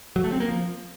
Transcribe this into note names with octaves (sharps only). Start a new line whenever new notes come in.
F#3
A3
C4
A#3
F3